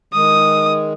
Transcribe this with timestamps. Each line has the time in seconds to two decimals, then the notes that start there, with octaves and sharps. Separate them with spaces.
0.14 D#3 G#3 D#6